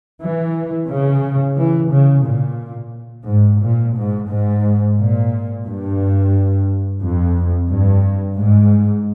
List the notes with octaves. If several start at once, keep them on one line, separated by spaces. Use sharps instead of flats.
E3
C#3
E3
C#3
A#2
G#2
A#2
G#2
G#2
A#2
G2
F2
G2
G#2